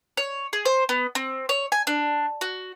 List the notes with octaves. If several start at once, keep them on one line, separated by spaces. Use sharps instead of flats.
C#5
G#4
C5
B3
C4
C#5
G#5
D4
F#4